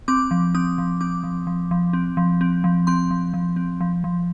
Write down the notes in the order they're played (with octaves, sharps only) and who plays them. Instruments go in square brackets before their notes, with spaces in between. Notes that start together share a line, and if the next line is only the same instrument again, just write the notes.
[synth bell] C4 D6
F3
C4 D#6
F3
C4 D6
F3
F3
F3
C4
F3
C4
F3
C4 C6
F3
F3
C4
F3
F3